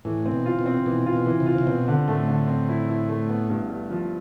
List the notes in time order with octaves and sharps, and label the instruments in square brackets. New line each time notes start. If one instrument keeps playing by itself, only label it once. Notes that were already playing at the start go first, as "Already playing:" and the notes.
[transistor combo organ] A2 [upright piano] E3
[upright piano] C4
[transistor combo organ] B2
[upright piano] F4
[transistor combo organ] B2
[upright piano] C4
[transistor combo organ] B2 [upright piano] E3
[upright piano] F4
[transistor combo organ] B2
[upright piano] E3
[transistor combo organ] C3
[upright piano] F4
[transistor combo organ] C3
[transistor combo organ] B2 [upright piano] C4
[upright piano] D3
[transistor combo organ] A2 [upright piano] A3
[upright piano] D3
C4
E4
E4
A3
B3
G2
G2
F3